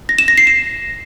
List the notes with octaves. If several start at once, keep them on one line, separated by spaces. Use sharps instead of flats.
A#6
E7
A#6
C7
E7